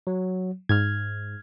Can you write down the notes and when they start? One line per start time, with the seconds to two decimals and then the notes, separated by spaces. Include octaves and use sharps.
0.07 F#3
0.69 G#2 F6 G#6